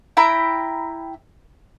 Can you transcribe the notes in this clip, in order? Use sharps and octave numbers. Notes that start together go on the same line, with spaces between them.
E4 G5 A#5 B5